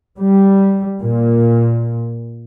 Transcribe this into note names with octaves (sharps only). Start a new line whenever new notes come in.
G3
A#2